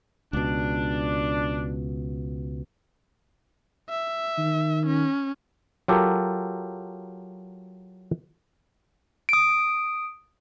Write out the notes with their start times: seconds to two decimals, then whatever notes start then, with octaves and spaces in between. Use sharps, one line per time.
0.33 C#2 B2 D4
3.89 E5
4.38 D#3
4.87 C#4
5.88 F#3 F4 G4 A4 A#4
9.29 D#6 D7